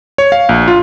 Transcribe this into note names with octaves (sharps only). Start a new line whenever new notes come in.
C#5
F5
A#1
F4